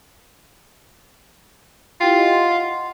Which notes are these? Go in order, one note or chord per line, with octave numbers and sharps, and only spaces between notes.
E4 F4 G4 G5
D#5 F#5 C6